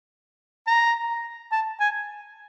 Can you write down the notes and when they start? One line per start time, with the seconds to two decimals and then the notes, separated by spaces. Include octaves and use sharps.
0.67 A#5
1.52 A5
1.80 G#5